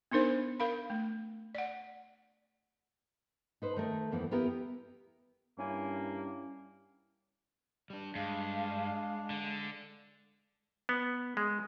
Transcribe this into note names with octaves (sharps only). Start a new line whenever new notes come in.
B3 D4 D#4 A#4 C5
A#4 F5 B5
A3
D5 F#5
D#4 B4 C5
D#3 A3 A#4
F2 E3 A#3 B3
B3 E4 G4 A#4
G2 A#3 C#4 E4 G#5
G3 D4
G2 G#3 D4 F5
D3
B3
G#3